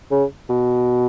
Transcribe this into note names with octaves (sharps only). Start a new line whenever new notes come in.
C#3
B2